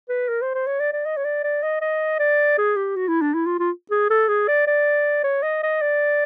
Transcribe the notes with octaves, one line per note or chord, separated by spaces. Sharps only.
B4
A#4
C5
C5
C#5
D5
D5
D#5
C#5
D5
D5
D#5
D#5
D5
G#4
G4
F#4
E4
D4
E4
F4
F4
G#4
A4
G#4
D5
D5
C#5
D#5
D#5
D5